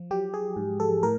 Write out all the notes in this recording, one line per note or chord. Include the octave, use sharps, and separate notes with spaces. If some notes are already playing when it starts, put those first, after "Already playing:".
Already playing: F3
F#3 G4
G#4
G#2
A4
A2 A#4